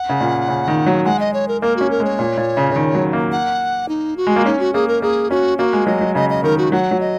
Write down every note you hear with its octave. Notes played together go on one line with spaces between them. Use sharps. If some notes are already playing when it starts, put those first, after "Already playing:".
Already playing: F#5
C#3
A#2
C#3
D#3
F#3
G#3 F#5
D#5
C#5
A#4
A#3 A#4
C#4 F#4
A#4
G#3 C#5
A#2
A#2
C#3
C#3
D#3
F#3
A#3
F#5
D#4
F#4
G#3
A#3
C#4 D#4
F#4
A#3 G#4
A#4
A#3 G#4
C#4 F#4
A#3 F#4
G#3
F#3 D#5
F#3
C#3 D#5
D#5
D#3 A#4
F#4
F#3 F#5
F#3
D#5